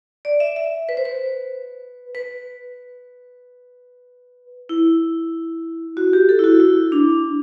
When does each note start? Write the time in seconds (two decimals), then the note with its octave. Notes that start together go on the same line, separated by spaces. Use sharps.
0.25 D5
0.40 E5
0.56 E5
0.89 B4
0.97 C5
1.05 B4
2.15 B4
4.69 E4
5.97 F#4
6.13 G4
6.29 A4
6.39 E4
6.44 F#4
6.60 E4
6.92 D4